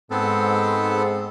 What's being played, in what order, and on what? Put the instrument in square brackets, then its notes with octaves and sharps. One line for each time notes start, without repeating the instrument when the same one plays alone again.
[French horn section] G#2 [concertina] B3 C4 A4